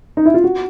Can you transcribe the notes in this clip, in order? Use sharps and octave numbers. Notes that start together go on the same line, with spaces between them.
D#4
E4
F4
F#4